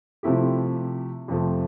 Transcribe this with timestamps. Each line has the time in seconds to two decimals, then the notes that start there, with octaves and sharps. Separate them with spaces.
0.23 C3 F3 A3 E4 G4
1.28 F2 C3 F3 A3